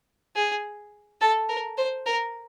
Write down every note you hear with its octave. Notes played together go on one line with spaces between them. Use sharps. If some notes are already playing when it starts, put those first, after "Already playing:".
G#4
A4
A#4
C5
A#4